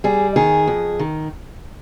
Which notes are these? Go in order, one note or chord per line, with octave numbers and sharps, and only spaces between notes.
G3 G#4
D#3 G#4
F2
D#3